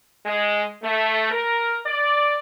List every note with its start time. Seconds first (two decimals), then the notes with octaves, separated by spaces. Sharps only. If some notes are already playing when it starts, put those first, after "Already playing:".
0.25 G#3
0.82 A3
1.31 A#4
1.85 D5